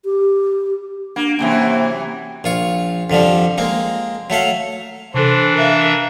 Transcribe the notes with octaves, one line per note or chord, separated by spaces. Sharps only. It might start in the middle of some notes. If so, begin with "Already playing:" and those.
G4
A#3 D4
F#2 C3 E3 A#3
A#1 F4 C#6
F2 D3 F3 G3
G#3 A#3 C4
F#3 A3 A4 F5
C3 E3 D4 A4 C5
A#4 E5 F5